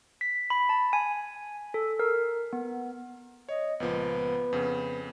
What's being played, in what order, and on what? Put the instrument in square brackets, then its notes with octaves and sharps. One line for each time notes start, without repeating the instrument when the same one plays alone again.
[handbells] B6
B5
A5
G#5
A4
A#4
B3
[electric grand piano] C#5 [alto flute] D#5
[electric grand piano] C#2 A#2 F3 [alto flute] B3
[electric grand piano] F2 C#3